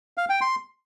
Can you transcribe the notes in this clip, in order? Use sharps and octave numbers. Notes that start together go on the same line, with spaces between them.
F5
G5
C6